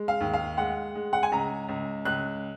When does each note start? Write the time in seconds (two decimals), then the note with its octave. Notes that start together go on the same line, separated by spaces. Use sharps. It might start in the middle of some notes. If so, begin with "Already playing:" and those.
Already playing: G#3
0.08 F5
0.20 D#2
0.34 F5
0.58 G#3 F#5
0.95 G#3
1.13 F#5
1.23 G#5
1.32 C#2 A#5
1.69 C#2
2.05 C#2 F#6